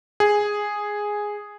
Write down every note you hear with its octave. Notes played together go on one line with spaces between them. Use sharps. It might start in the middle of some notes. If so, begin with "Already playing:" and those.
G#4